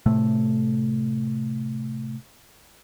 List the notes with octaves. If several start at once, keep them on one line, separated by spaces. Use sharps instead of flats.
A2 C3 A3